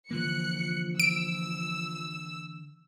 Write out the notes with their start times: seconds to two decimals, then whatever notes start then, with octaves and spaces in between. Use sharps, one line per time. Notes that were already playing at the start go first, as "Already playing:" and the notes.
0.11 D3 E3 F3 A#3 F#6 C#7
1.00 E6 D7